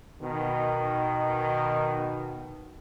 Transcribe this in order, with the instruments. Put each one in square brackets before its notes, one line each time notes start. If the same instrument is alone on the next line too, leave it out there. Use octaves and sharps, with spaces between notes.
[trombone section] B2 D#3